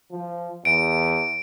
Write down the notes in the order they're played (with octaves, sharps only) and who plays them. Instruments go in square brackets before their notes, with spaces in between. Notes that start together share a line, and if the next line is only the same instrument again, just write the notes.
[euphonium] F3
[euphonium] E2 [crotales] D7